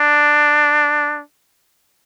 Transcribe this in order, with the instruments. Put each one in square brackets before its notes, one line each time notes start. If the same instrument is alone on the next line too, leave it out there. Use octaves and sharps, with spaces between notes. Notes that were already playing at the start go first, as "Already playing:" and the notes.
Already playing: [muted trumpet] D4